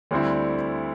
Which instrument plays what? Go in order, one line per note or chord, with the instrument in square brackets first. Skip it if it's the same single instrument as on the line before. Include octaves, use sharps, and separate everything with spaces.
[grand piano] D2 D3 G3 C4 E4